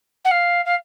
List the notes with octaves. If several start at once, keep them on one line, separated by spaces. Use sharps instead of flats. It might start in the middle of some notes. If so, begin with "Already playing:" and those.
F#5
F5
F5